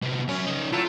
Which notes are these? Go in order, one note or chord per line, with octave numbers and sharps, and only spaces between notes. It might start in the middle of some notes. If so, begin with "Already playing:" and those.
C3 B3
F#3 C#4 E5
C#3 D#4
F#3 A3 E4 F4